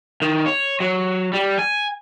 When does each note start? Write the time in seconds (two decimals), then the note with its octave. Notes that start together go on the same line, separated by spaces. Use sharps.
0.22 D#3
0.46 C#5
0.80 F#3
1.33 G3
1.59 G#5